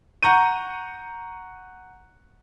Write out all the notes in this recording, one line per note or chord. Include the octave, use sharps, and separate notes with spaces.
F#5 A#5 C#6 G6 D#7